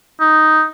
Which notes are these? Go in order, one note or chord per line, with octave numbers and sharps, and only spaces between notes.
D#4